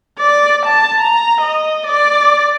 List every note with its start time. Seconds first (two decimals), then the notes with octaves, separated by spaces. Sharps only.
0.19 D5
0.66 A5
1.01 A#5
1.41 D#5
1.87 D5